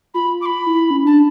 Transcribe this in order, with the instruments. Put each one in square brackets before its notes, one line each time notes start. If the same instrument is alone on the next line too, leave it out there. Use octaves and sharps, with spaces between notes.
[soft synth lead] F4 [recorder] B5
[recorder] D6
B5
[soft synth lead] E4
C#4
[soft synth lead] D4 [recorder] A5